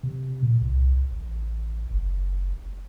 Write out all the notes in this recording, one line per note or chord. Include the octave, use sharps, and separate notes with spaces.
C3
A#2
C2
A1
F#1